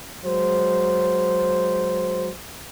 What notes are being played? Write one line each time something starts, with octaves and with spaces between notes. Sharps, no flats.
F#3 G#3 C5